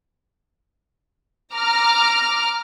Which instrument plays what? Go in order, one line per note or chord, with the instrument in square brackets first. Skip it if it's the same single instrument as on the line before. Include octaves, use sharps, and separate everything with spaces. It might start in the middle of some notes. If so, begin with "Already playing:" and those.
[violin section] A#5 D6 F6